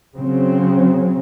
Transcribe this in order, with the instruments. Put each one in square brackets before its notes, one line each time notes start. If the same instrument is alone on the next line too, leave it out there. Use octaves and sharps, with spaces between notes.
[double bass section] C#3 F#3 C4